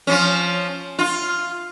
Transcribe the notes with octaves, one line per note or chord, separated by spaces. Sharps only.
F3 C#4
F4